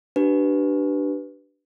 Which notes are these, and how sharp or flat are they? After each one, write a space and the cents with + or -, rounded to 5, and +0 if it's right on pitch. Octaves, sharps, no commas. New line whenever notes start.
D4 +5 G4 -35 B4 +0